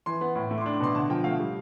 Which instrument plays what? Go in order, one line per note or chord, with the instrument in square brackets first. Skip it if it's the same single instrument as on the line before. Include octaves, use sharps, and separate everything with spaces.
[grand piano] E3 C6
B3
A2
A3
D6
D4 C6
D6
B2 C6
D3 A5
F3 G5
A3 F5
G3